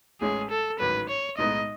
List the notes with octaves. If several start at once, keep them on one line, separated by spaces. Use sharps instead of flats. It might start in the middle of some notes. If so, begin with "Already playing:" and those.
A1 A2 G#3 C#4 G#4
A4
A1 G#2 D#3 F#3 B4
C#5
B1 A2 G#3 B3 D#4 D#5